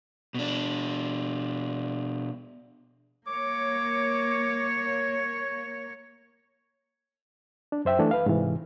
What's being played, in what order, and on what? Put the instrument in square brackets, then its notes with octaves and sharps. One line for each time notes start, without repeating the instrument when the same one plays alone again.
[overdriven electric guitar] B2 D4
[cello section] A#3 C#5 [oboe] D6
[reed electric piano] D4
F#2 C5 E5 G5
E3 A3 D4
B4 F5
G#2 C3 E3